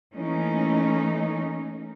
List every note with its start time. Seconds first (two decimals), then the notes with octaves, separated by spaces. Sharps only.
0.13 E3 A3 A#3 C#4 D#4